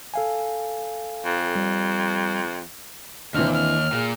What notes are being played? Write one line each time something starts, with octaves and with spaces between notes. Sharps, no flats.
A4 F5 G#5
F2
G3
D#2 E3 C4 D4 F6
F6
A#2 G#4